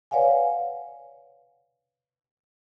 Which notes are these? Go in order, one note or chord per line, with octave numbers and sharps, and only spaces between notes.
B4 C#5 D5 F5 F#5 G#5